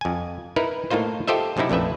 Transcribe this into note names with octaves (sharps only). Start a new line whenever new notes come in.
F2 G#5
D#4 E4 A#4 B4
A2 A#3 D#4 F4 C5
F4 G4 A4 C5 D#5 E5
F#2 C3 C4 D#4 E4
A#1 F2 A3 B4 E5